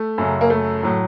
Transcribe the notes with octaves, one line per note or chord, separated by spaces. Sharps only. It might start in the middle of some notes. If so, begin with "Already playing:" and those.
Already playing: A3
F#2 C#3 F#3
A#3
A3
A2 F#3